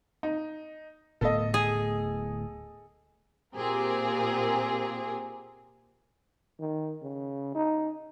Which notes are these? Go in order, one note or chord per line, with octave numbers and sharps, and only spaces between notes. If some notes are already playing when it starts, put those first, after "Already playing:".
D#4
D1 A2 B3 A4 D#5
G#4
A#2 C4 G4 G#4 A#4
D#3
C#3
D#4